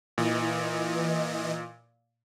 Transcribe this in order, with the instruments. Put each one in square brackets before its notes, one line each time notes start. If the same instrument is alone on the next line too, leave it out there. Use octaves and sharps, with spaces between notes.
[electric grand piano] A#2 [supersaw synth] E3 D#5